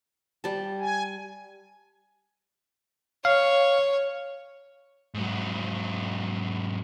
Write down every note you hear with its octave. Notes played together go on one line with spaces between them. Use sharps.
G3 A5
G#5
C#5 F5
G#2 F#3